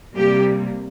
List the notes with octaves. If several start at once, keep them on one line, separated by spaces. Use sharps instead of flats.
C3 G3 A#3 G4